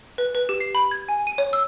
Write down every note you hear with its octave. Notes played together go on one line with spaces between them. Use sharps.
B4
B4
G4
C7
B5
G#6
G#5
D#7
C#5
E6